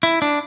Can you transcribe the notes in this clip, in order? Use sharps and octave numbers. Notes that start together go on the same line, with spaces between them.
E4
D4